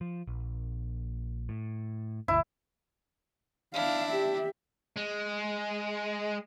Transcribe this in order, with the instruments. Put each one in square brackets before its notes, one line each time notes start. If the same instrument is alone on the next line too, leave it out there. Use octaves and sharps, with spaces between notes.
[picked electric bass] F3
A#1
A2
[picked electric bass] G1 D2 [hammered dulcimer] E4
[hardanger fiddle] D4 E4 [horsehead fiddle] F5
[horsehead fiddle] G4 E5
[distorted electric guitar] G#3